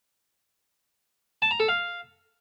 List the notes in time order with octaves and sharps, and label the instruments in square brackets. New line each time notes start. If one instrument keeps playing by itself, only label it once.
[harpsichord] A5
A#5
A4
F5